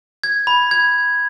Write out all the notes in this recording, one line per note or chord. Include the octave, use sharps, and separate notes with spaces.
G#6
B5
G#6